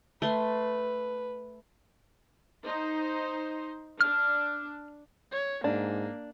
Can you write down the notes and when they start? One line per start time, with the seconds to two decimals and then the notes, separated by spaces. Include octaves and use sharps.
0.22 A3 B4 C6
2.65 D#4 C5
4.01 D4 F6
5.32 C#5
5.64 G#2 A#3 D4